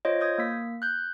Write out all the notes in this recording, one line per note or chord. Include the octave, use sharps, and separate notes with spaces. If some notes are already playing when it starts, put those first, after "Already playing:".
F4 C5 C#5 D#5
D#6 G6 G#6
A#3 B6
F#6 G6